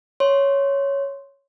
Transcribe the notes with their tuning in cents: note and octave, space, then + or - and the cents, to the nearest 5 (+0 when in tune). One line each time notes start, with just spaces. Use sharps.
C#5 +0 C6 +0